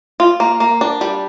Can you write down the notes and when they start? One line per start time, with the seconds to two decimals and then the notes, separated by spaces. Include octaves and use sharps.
0.20 F4
0.40 A#3
0.60 A#3
0.81 D4
1.01 G3